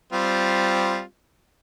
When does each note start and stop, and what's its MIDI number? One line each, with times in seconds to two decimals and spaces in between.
0.13 1.02 55
0.13 1.02 60
0.13 1.02 65